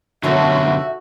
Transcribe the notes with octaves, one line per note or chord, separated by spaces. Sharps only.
F#2 B2 D3 D#4 F#4 A4 C#5 E5